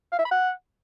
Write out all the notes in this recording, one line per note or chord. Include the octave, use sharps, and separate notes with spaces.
F5
E5
B5
F#5